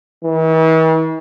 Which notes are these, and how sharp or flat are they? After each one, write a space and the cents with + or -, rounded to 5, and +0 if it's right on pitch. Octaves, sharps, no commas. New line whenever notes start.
E3 -45